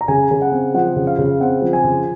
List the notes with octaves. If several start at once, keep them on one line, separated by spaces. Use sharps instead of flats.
A#5
C#3 G#5
C#3
F#5
C4
F3 F#5
C#3
F5
C#3
C4 F#5
F3
G#5
C#3